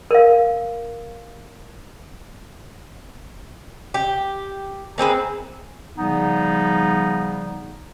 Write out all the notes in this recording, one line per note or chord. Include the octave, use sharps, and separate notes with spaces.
A#4 F5
G4
A#3 C4 G#4 B4
C#3 F3 G3 B3 D#4